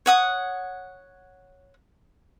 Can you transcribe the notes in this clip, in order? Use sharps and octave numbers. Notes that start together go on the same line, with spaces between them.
C#5 F#5 D#6